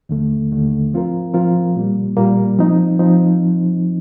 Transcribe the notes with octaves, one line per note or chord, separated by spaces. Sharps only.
D#2 D3 A3
D#2 D3 A3
F3 C4 F4 A#4
F3 C4 F4 A#4
A#2 G3 A#3
A#2 G3 A#3
F3 C4 D#4
F3 C4 D#4